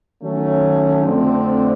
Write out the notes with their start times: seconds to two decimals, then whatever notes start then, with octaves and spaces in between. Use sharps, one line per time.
0.23 D#3 F#3 A3 C#4
1.04 F2 D3 F3 A3 C4